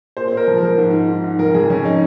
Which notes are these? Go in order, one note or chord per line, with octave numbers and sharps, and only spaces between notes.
A#2 C5
C5
A#2 A#4
F3
F3 A#4
G#2
G#2
G#2
G#2
F2 A#4
F2 G#4
F2 C#4
D#4